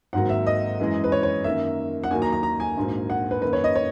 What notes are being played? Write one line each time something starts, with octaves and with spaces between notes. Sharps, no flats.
G#1 G#2 F#3 A#3 F#5
E5
D#5
F#2 E3 G#3
B4
C#5
C#5
F#2 D#3 A#3 E5
F#5
D#2 D#3 F#3 A#3 G#5
A#5
A#5
A#5
G#5
A#1 G#2 F#3 A#3
F#5
B4
F#2 D#3 A#3 B4
C#5
D#5
C#5